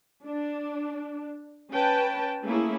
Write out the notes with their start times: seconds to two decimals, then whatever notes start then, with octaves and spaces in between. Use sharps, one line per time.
0.25 D4
1.72 C#4 B4 G5 A5
2.45 A3 A#3 C#4 E4 G#4